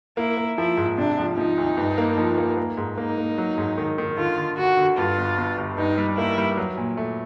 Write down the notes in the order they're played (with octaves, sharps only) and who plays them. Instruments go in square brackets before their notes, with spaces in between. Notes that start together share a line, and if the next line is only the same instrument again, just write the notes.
[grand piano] A#3 [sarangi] E4
[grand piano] A#3
[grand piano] F3 [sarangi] E4
[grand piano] G#2
[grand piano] C3 [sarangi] D4
[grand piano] F3
[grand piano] F3 [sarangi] D#4
[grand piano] D2
G2
A#3
F3
A#3
A#3
G#2
[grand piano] A#3 [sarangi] D#4
[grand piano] A#3
F#3
G#2
D#3
D#3
[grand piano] D3 [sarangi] F4
[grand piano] D3
[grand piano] D3 [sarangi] F#4
[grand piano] D3
[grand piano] G2 [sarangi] F4
[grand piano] G1
G1
G1
[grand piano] G2 [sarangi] D#4
[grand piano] G3
[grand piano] A#3 [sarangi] E4
[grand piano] G3
F#3
A#2
A3